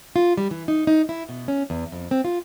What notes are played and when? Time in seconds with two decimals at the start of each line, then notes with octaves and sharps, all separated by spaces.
0.16 F4
0.37 G3
0.51 E3
0.68 D#4
0.87 D#4
1.09 E4
1.29 B2
1.48 C#4
1.70 E2
1.92 F2
2.11 C4
2.25 F4